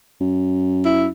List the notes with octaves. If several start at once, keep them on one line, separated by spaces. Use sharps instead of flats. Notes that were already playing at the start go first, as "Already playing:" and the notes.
F#2
E4